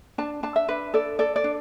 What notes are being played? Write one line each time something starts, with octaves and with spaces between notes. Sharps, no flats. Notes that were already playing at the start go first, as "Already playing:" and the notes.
D4 A5
D4 A5
E5
D4 B4
A4 D5
A4 D5
D5
D4